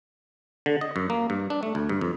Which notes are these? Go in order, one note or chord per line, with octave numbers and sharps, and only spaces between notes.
D3
D#5
F#2
A#3
G2
D4
A3
D2
G2
F2